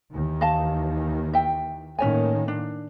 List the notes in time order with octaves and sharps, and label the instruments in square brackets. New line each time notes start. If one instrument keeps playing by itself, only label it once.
[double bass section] D#2 D#3 E3
[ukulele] D#5 F5 A5
E5 G5
[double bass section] A2 D#3 A#3 [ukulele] C#4 C#5 G#5
[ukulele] D4